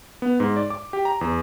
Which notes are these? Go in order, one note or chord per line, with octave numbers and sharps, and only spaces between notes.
B3
G#2
D5
D6
G4
A#5
E2